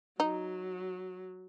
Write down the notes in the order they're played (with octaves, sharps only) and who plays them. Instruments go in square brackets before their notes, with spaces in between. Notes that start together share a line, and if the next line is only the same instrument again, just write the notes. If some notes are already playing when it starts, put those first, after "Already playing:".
[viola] F#3 [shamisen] D#4